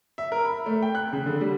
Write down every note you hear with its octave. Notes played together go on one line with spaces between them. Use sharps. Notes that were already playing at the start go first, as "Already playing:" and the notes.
E5
A#4
B5
A3
G5
F#6
C#3
D3
G3